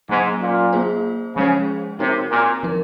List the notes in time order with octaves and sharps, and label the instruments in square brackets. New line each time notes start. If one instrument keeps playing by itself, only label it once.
[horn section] G#2 [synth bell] F#3 A#3 C#4
[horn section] A#2
[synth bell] A#3 F4 G#4 C5
[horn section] C#3 [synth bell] F3 G#3 C#4 G#4 C5
[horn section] C3 [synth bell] C4 D#4 F#4 A#4 C#5
[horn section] A#2
[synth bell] F3 G#3 D#4 A#4